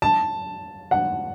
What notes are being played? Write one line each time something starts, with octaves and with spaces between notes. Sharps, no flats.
A5
F#5